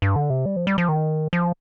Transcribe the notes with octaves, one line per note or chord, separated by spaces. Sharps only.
G2
D3
C3
G3
F3
G3
F3
D#3
F3